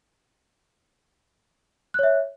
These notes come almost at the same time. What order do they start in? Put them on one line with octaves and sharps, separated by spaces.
F#6 C#5 E5